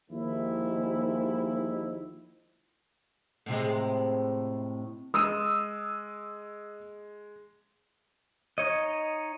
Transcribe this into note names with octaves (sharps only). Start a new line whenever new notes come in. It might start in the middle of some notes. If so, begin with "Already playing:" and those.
D#2 D#3 F3 G#3 E4
A2 C3 G#3
G#3 D#6 E6 D#7
D#4 C#5 D#5